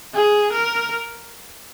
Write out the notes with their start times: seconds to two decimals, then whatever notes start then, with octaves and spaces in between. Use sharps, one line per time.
0.15 G#4
0.53 A#4